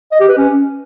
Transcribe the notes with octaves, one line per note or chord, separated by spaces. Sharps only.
D#5
G4
B4
C#4